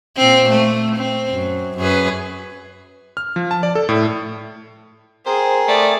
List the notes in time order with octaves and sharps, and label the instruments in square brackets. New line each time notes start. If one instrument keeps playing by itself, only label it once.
[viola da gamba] A#2 C4
A3
C4
F#2
F#2 G#4 B4
[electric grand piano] F6
F3
A5
D5
A4
A2
[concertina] C4 A#4 [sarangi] G#4 [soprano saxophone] C5
[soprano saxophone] A3 [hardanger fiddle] D5